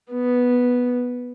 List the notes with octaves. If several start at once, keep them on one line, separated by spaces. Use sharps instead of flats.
B3